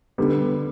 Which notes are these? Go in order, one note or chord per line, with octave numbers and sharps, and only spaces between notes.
D3 G3 B3